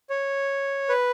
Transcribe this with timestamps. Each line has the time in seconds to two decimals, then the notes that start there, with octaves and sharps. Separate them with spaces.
0.10 C#5
0.89 B4